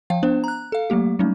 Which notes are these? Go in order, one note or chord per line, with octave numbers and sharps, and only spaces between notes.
F3 F5 G5
B3 D4 C5
A#5 F#6
A4 F5
F#3 A3 A#3 G4
F#3 G3 A3 C#4 D#4